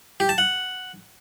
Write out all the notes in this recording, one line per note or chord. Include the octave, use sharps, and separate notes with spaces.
G4
A5
F#5